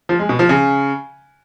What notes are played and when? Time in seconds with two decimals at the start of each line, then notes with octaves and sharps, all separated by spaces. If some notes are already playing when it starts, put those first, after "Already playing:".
0.09 F3
0.19 G#3
0.29 B2
0.39 F3
0.49 C#3